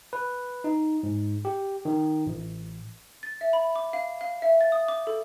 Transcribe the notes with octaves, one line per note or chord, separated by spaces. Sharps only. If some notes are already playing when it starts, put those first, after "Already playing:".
B4
D#4
G#2
G4
D#3
A1
A6
E5
B5
D6
F5
F5
E5
A6
D#6
D6
A4